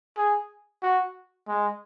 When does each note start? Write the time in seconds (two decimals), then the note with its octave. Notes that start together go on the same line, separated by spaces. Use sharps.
0.17 G#4
0.82 F#4
1.48 G#3